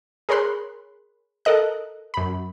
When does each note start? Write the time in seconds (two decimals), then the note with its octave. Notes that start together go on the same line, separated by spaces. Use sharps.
0.29 G#4 A#4 C#5 B5 C6 F#6
1.45 A4 A#4 D#5 F#6
2.14 F#2 B5